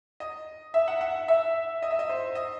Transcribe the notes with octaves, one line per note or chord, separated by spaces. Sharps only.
D#5
E5
F#5
F#5
E5
D#5
E5
D#5
C5
D#5